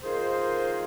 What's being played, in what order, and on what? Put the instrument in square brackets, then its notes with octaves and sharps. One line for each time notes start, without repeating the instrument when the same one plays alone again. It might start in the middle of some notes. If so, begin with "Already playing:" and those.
[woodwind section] D#3 A#3 F4 G#4 C5